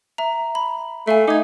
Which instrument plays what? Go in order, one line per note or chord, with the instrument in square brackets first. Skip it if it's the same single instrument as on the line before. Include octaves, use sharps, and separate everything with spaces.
[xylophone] E5 A#5
B5
[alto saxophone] A3 [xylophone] E5 F5 G#5
[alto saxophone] D#4 [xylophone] D6 G#6